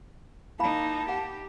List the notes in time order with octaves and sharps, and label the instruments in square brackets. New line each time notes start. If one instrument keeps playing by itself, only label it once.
[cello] A#3 D#4 [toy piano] E4 F5 B5 [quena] A5
[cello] G4 [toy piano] F#5